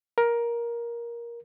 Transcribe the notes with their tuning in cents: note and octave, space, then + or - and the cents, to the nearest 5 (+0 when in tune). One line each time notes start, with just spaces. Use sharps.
A#4 +15